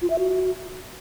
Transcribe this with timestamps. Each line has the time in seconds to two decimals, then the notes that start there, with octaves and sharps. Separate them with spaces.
0.02 F4
0.10 E5
0.18 F#4